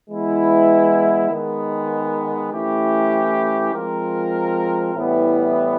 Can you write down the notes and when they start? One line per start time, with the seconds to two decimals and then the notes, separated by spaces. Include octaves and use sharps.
0.09 E3 G#3 B3 E4
1.30 D#3 G#3 B3
2.52 E3 A3 C#4 E4 G4
3.73 F3 G#3 C4 F4 A#4
4.95 A2 E3 G3 B3 E4